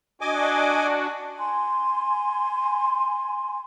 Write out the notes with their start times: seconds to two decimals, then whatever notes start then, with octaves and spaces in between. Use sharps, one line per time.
0.21 D4 F#4 D#5 G#5 D6
1.37 G#5 C6